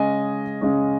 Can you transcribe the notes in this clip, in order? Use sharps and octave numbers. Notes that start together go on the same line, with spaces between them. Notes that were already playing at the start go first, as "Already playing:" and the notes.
Already playing: C#3 G#3 C#4 D#5 G#5
C#3 G#3 C#4